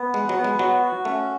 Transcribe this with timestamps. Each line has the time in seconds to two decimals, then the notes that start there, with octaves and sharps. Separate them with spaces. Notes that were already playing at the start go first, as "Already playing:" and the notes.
Already playing: B3
0.14 G#3 F#5
0.29 F#3
0.37 B3
0.44 G#3
0.59 F#3 F#4
0.83 F#4
1.05 A3 C#4